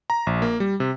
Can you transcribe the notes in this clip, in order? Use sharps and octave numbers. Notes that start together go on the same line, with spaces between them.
A#5
A#1
A#3
G3
C3